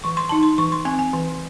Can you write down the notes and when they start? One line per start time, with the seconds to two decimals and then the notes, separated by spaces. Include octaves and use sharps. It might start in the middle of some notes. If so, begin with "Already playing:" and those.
0.04 E3 C#6
0.17 C6
0.29 D#4 A5
0.43 C6
0.58 E3 C#6
0.72 C6
0.85 C4 G#5
0.99 G#5
1.14 E3